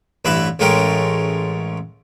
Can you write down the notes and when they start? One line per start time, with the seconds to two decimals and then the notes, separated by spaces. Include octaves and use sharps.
0.25 A1 G2 E4 B4 E5 B5
0.59 A1 G#3 A3 C#4 A#4 G5